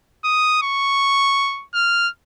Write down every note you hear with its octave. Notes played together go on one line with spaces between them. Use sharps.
D#6
C#6
F6